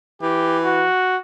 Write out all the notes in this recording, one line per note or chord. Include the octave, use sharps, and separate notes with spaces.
E3 G4
F#4